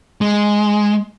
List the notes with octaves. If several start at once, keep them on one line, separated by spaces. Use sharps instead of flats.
G#3